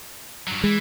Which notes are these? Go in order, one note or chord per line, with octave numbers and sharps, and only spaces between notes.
G2 F#3
E3 G#3